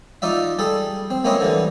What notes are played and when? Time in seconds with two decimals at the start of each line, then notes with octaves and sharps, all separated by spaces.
0.22 D#4 F4 D5 E5
0.59 G3 G#4 A4
1.10 C4
1.24 A#3 C4 C#4 E4 D#5 G#5
1.40 D3 E3 G3